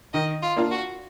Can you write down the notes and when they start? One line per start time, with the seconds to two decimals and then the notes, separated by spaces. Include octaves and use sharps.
0.13 D#3 D#5
0.42 F4
0.56 A#3 D4 F4
0.71 F#4